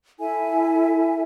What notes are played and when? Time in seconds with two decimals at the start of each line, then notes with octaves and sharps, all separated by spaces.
0.20 E4 A4 E5 G#5